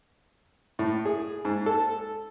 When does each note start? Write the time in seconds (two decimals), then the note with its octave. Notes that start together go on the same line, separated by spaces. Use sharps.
0.79 A2
1.06 G#4
1.45 G#2
1.66 A4